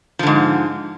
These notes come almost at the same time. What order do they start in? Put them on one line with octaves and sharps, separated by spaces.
F3 D3 G#2